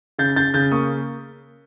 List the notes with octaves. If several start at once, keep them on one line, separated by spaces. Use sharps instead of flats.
C#3 G6 A6
C#3 G6 A6
C#3 G6 A6
A#3 C#6 D#6